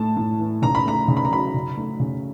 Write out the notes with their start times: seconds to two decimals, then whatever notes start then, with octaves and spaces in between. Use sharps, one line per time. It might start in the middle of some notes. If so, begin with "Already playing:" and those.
Already playing: A2 A3 A5
0.17 A2
0.39 E3
0.62 C#3 A#5
0.75 B5
0.86 A3 A#5
1.08 C#3
1.17 B5
1.25 A#5
1.31 F#3 B5
1.54 C#3
1.77 A3
2.00 C#3